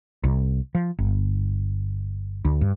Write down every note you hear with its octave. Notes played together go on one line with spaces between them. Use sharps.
C2
F3
G1
D2
G2